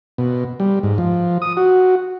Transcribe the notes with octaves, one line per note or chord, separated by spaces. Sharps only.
B2
G3
G#2
F3
D#6
F#4